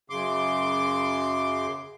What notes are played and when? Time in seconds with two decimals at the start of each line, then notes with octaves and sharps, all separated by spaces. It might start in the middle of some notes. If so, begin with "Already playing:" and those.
0.10 F#2 C#3 C6 D6